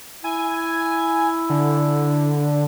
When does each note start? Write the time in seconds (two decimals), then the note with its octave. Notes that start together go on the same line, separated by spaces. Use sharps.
0.24 E4 G#5
1.50 D3